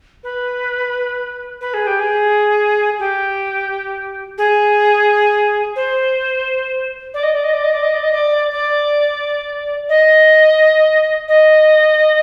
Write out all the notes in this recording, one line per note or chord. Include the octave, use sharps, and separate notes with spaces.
B4
B4
G#4
G4
G#4
G4
G#4
C5
D5
D#5
D5
D#5
D5
D#5
D5
D#5
D5
D#5
D5
D5
D#5
D#5